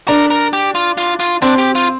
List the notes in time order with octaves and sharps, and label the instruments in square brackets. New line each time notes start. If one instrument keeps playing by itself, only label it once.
[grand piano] D4 [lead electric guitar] A#4
[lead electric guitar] A#4
G4
F4
F4
F4
[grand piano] C4 [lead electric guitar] D4
[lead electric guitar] G4
F4